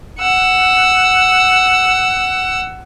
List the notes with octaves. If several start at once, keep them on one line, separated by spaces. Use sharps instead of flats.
F#5 E6